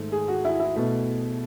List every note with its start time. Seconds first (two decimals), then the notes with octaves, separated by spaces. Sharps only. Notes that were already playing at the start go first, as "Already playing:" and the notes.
Already playing: G#2 D#3 A3
0.12 G#4
0.28 F#4
0.45 E4
0.60 E4
0.76 B2 A3